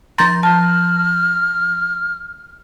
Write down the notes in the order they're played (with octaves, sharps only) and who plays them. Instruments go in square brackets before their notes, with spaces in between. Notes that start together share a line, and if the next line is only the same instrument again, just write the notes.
[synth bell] F3 G6 A#6 [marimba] A#5 C6 A6
[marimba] A5 [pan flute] F6